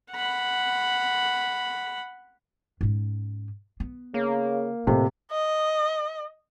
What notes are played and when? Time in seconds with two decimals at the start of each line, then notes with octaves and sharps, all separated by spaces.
0.12 F#5 B5
2.81 G#2 C#4
3.80 B3
4.14 C#3 A#3
4.87 F2 A2 C3 A3
5.31 D#5